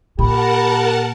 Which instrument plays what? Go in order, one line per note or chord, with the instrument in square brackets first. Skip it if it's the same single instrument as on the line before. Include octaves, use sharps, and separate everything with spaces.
[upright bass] A#2 [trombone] G4 [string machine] A#4 F#5 A5 [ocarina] B5